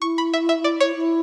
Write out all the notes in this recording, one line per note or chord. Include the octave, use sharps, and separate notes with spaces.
E4 C#6
B5
E5
E5
D5
C#5
E4